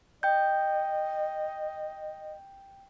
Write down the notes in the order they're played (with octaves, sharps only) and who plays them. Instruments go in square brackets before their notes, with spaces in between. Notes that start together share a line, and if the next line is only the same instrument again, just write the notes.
[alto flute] D#5 [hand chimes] G5 G6